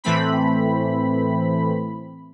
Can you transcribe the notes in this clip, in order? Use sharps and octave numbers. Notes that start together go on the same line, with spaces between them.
A2 E3 A3 C4 B5